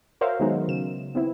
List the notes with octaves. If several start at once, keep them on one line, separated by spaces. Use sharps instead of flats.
F#4 A#4 C5 C#5 E5 F5
D#3 F#3 G#3 B3 D#4 F#4
C#3 E7
B3 C4 E4